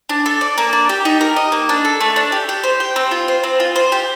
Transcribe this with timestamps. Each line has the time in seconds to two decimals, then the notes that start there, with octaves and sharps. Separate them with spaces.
0.09 D4
0.26 A4
0.41 D5
0.58 A#3
0.73 D4
0.89 G4
1.05 D#4
1.21 A#4
1.36 D#5
1.52 A#3
1.69 D4
1.85 A4
2.01 A3
2.16 D4
2.32 G4
2.49 G4
2.64 C5
2.80 G5
2.96 C4
3.11 F4
3.28 C5
3.43 C4
3.60 F4
3.76 C5
3.92 G4